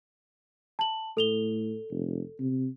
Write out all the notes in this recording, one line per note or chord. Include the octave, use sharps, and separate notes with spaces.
A5 F#7
A2 A4 F7 G7
F1
C3